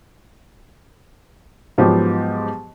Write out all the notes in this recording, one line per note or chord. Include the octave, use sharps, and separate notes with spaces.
G#2 F3 F#3 B3 G4